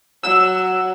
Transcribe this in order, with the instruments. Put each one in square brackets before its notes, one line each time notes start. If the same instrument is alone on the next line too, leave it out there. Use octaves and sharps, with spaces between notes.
[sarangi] F#3 [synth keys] E6 E7